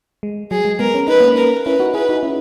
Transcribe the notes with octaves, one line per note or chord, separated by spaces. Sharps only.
G#3
F#3 G#4
G#3
G#3 B3 A#4
C#4
D#4 B4
A#3 C#4
A#4
C#4 E4 B4
D#4 F#4
E4 G#4 B4
D#4 F#4
C#4 E4